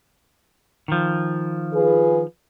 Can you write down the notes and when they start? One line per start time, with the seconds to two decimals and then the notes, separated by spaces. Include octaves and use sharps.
0.88 D#3 F3
1.74 F4 G#4 B4